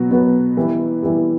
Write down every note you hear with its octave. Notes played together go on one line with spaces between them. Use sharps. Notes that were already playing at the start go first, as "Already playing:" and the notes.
Already playing: B2 F#3 B3 F#4
B2 F#3 B3 F#4 B4
E3 G3 B3 E4 G4
E3 G3 B3 E4 G4